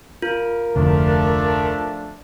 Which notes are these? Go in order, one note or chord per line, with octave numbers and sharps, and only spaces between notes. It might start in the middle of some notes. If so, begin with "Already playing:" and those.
F4 A#4
F1 D2 F3 A3 D4